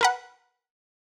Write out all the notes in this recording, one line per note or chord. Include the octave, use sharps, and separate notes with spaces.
A#4 B4 F#5